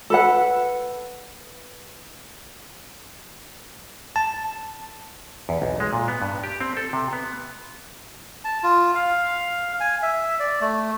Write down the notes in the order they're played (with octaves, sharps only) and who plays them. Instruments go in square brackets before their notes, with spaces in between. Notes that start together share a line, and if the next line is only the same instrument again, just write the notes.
[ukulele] A4 B4 F#5
[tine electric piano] A5
[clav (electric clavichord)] E2
B1
G#3
A#2
B3
G2
G4
C4
A4
C3
B3
[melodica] A5
F4
F5
G#5
E5
D5
A3